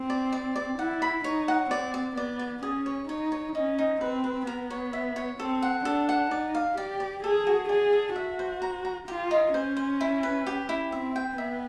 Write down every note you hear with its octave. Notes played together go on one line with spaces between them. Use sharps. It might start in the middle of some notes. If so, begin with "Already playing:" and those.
Already playing: C4
D5
D5
D5
E4 F#5
B5
D#4 C#5
F#5
C4 D5
D5
B3 D5
D5
C#4 G#4
C#5
D#4 C#5
C#5
C#4 D#4
D#4
C4 B4
B4
B3 A#4
C#5
E5
C#5
C4 A4
F#5
D4 A4
F#5
D#4 D5
F5
G4 D5
D5
G#4 A4
F#4
G#4 D5
A4
F#4 E5
C5
A#5
A#5
F4 G4
D#4
C#4 C5
C5
E4
B4
G4
E4
C4 E5
G5
B3 E5